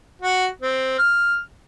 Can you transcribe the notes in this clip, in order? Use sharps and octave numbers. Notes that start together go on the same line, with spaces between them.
F#4
C4
F6